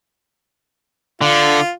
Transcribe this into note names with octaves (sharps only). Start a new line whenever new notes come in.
D3 F4